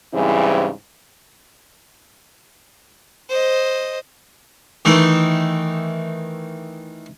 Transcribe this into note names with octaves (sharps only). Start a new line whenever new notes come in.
G#2 C#3 E3 G3 C4 E4
C5 D#5
D#3 E3 A3 D#4